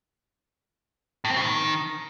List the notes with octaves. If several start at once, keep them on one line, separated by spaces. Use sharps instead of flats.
A2
C4
B2
D#3